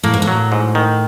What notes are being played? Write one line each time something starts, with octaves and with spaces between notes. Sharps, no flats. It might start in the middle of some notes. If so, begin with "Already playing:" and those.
A2 A#3
G#2
A2
F#3
G#2
D#3